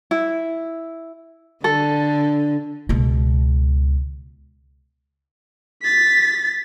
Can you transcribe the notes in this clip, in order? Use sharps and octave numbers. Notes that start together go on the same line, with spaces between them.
E4
D3 A4
C#2 B2
A6 B6